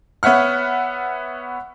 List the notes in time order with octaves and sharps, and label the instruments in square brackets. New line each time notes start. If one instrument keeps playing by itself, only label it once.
[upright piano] B3 C#5 E5 F#5 F6